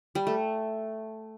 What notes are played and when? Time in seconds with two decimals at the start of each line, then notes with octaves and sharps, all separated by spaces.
0.15 G3
0.27 A3